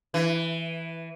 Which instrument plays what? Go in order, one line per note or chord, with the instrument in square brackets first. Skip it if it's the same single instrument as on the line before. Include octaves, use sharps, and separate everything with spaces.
[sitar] E3